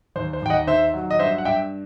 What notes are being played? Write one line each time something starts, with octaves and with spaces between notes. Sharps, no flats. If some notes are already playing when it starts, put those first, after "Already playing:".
D#2 C5
C5
D#2 G5
D#5 F#5
D#3 C5 E5
F#3
D#5
G2 C5 E5
F#5
G2 E5 G5